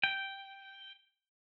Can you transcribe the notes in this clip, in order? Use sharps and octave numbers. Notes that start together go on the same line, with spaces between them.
G5